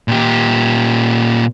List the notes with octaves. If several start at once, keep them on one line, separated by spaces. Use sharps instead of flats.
A#2 G4